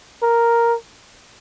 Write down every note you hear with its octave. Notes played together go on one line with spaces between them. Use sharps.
A#4